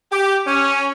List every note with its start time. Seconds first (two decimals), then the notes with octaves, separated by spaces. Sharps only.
0.12 G4
0.46 C#4